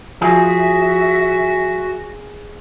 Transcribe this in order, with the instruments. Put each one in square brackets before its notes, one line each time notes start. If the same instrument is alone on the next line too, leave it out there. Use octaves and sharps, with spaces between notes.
[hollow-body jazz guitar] F3 [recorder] F#4 [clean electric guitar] G#4 [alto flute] E5